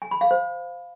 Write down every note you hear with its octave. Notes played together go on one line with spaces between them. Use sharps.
G#5
B5
F5
C5